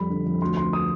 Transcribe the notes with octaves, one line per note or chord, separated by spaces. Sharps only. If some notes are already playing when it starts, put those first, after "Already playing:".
Already playing: F2 G3 B5
D3
F2
D2 C6
D2 C6
D#6